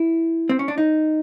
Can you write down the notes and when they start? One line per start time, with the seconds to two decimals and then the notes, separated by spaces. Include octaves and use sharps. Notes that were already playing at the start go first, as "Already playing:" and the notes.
Already playing: E4
0.49 C4
0.59 C#4
0.68 D4
0.78 D#4